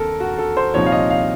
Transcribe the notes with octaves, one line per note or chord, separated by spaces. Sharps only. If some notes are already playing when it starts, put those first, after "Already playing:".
Already playing: D#2 C4 A4 A#4
F#4
A4
C5
C2 A#2 F3 C4 D#4 C#5
F5
D#5
F5